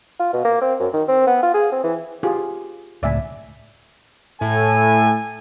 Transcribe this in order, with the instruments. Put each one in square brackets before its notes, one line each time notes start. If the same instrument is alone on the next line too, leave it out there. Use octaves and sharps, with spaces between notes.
[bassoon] F4
B2
A#3
C4
F#2
D#3
C4
B3
F4
G#4
C4
E3
[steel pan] F4 G4 G#4
[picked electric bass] C#2 A2 [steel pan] D5 E5 G#5
[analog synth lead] A2 [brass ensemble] A4 G#5